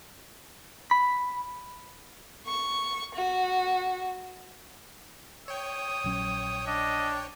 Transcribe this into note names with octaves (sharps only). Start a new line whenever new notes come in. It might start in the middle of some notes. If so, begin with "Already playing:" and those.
B5
C#6
F#4
C#5 G5 D#6
A#1 F#3 C#4
D4 D#5